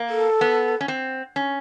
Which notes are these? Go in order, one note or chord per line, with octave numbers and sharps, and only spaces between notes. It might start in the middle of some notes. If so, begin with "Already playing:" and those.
Already playing: A#3
A4
B3
C#4
C4
C#4